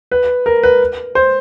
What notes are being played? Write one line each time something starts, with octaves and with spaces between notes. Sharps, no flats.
B4
A#4
B4
C5